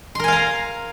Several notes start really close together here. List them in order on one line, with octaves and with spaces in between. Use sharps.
C6 A#4 G#5 F5 A#5